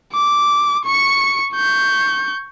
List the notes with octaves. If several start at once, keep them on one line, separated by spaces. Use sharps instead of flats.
D6
C#6 C#7
C#6 G6